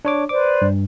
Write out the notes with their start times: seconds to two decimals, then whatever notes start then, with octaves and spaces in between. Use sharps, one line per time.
0.05 D4 C#5 D6
0.29 B4 C5 D5 D6
0.62 G2